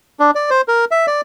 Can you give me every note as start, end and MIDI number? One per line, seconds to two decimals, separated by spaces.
0.20 0.31 62
0.35 0.50 74
0.50 0.61 72
0.68 0.85 70
0.91 1.06 76
1.07 1.21 74